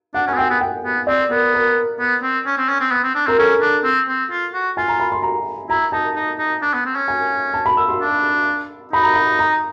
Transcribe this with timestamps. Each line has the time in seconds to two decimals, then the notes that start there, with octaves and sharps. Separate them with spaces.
0.14 D4 F#5
0.27 C#4 G#5
0.34 B3
0.38 C4 G5
0.50 B3
0.61 G5
0.84 B3
1.07 C4 D5
1.30 B3 A#4
1.54 A#4
2.00 B3
2.23 C4
2.46 C#4
2.58 C4
2.69 C#4
2.81 C4
2.91 B3
3.03 C4
3.15 D4
3.26 C4 A#4
3.38 C#4 A4
3.61 D4
3.84 C4
4.08 C4
4.31 F4
4.54 F#4
4.77 F4 G#5
4.88 A#5
5.00 B5
5.12 C6
5.23 A#5
5.70 E4 A#5
5.92 D#4 A5
6.15 D#4
6.38 D#4
6.62 D4
6.73 B3
6.85 C4
6.96 C#4
7.08 G#5
7.54 A5
7.66 B5
7.77 E6
7.88 C6
8.00 D4
8.93 D#4 B5
9.03 A#5
9.14 B5
9.39 A#5